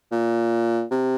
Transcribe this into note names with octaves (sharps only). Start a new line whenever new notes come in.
A#2
C3